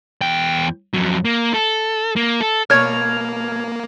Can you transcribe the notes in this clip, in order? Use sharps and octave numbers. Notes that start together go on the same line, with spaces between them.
E2 G5
F2 F#3
A#3
A4
A#3
A4
B2 A#3 C#5 F6 G#6 F7